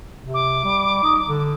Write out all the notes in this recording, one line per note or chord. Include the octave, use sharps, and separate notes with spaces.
C3
D6
G3
D#4
D3